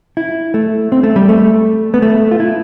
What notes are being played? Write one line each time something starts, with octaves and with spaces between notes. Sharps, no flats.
E4
A3
C4
A3
G3
A3
B3
A3
F4
E4